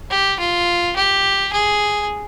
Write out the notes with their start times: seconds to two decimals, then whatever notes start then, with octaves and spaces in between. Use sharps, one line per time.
0.11 G4
0.40 F4
0.97 G4
1.54 G#4